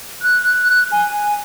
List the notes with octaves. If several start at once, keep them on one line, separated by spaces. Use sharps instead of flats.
F#6
G#5